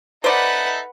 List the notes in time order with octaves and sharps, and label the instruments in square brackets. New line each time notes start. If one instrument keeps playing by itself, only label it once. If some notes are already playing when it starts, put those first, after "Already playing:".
[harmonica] D#4 A4 E5 [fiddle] B4 F#5 [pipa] C5 D5